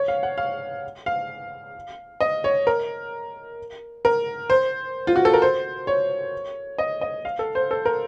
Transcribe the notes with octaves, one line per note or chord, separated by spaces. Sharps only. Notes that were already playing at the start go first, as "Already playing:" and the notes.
Already playing: C#5
F5
F#5
F5
F5
D#5
C#5
A#4
A#4
C5
F4
F#4
A4
A#4
C5
C#5
D#5
D#5
F5
A4
C5
A4
A#4